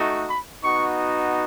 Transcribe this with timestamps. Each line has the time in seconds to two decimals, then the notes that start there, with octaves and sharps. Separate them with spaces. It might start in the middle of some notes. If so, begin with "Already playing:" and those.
Already playing: A3 D#4 F#4
0.28 B5
0.63 B3 D#4 F#4 C#6